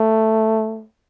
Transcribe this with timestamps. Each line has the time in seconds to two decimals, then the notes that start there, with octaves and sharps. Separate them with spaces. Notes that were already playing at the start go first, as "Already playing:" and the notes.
Already playing: A3